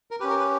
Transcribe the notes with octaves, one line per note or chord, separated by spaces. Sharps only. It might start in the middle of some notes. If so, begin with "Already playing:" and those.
A#4
C#4 G4 B4
A#4
B4